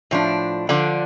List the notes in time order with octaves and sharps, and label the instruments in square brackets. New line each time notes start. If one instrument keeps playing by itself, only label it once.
[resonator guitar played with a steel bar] A2 F3 D4
D3 F3 D4